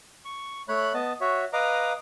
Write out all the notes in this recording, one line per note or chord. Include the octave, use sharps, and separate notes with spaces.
C#6
A3 C#5 B5 F#6
B3 D#5 A5
F#4 C#5 E5
B4 D#5 F5 A#5 D6